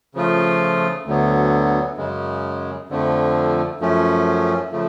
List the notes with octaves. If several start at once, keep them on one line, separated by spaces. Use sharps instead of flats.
C#3 F3 A3 F4
D2 D3 F#3 B3
F#2 C#3 G#3
F2 D3 F3 A3
F#2 F3 A3 C#4
C#3 F3 A3